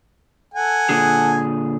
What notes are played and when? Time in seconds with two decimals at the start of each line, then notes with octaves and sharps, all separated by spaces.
0.54 A4 F#5 G#5
0.89 A#2 D3 G#4